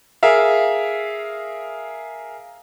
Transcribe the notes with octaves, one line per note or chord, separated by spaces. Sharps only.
G#4 A#4 E5 F5